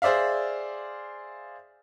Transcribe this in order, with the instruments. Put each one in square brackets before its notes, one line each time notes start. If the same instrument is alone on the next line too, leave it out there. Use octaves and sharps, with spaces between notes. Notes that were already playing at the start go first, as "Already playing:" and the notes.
[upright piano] G#4 C5 D5 E5 F5